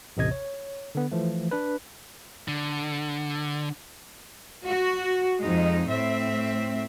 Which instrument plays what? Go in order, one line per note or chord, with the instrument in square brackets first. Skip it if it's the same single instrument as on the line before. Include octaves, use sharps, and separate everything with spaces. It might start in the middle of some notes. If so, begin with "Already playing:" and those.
[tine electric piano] A1 D#2 C3 D#5 G#6
C#5
D3 B3
E3 F3 A3
D4 B4
[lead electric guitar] D3
[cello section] F#4
F2 G#3 D#4
A2 C4 E5